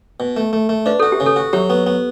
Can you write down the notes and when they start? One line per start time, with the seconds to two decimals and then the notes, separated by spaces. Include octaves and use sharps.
0.20 B2
0.37 A3
0.53 A3
0.69 A3
0.86 D4 B4
1.00 F#4 A4
1.12 G4
1.20 C#3
1.26 A4
1.36 F#4
1.53 F#3 G4
1.70 B3
1.86 B3